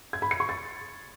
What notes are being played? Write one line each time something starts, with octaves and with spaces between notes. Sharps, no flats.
G#6
B5
C#7
C#6
A6